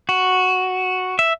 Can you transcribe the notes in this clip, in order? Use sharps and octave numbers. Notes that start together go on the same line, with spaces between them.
F#4
E5